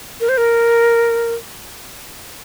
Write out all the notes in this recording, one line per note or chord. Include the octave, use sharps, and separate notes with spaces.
A#4
C5
A#4